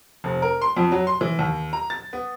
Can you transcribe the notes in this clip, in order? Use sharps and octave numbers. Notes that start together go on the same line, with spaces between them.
F1
A#4
C6
F2
F#3
C6
E3
D#2
A#5
A6
B3